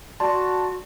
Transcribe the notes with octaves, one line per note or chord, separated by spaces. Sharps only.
F#4 D5 A5 C6